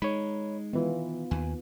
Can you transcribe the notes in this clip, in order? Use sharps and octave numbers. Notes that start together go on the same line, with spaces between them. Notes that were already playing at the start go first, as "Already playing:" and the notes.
G#3 D#4 C#5 B5
D#3 E3 B3 F4
D#2 G#5